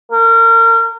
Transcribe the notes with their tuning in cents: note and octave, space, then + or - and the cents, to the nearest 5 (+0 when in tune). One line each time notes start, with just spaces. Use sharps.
A#4 -30